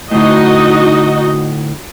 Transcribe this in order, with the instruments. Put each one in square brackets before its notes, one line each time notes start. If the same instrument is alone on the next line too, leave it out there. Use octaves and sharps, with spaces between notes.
[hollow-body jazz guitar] D2 A2 [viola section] D#4 F#4 D#5